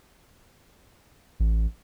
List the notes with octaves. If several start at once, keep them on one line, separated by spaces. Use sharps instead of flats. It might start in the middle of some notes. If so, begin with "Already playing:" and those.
A1